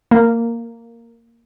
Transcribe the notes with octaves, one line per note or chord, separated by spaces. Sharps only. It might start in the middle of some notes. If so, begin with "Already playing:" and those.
A#3